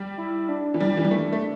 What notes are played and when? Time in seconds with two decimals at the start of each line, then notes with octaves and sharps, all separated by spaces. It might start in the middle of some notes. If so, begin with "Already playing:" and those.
Already playing: G3
0.18 E4
0.49 D4
0.74 E3
0.80 G3
0.97 E3
1.04 G3
1.11 A3
1.32 A3